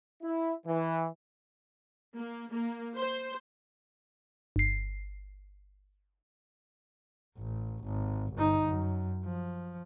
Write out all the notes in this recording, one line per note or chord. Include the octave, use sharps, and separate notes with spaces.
E4
E3
A#3
A#3
C5
G1 C7
A1
G#1
G1 D#4
F#2
F3